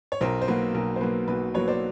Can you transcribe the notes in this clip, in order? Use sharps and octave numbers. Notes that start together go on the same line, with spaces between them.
C#5
B1 A#4 C5
C5
B2 F#3 A#3 B4
B1 A#4
C5
B2 F#3 A#3 B4
B1 B4
B2 F#3 A#3 B4 C#5
C5 D5